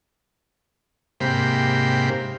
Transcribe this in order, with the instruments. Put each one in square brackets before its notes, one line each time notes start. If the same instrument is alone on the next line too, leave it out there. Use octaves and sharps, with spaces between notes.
[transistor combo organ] G#2 C3 A#3 G4 C5 B5